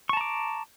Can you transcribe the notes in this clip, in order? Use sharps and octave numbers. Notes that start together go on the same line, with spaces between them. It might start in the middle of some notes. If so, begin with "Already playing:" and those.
A5 A#5 C#6 D6